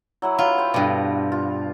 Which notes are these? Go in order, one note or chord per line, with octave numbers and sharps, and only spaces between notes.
F#3 E4 F#5
F#3 F4 B4
C5 G5
G2 B2 D4
F4